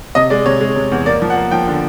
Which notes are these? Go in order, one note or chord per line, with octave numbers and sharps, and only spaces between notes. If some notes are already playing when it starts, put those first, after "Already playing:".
C3 D#5
G#3 D5
C3 C#5
G#3
C3
E2
A#3 D5
F3
F#5
A#3
F3 G5
D3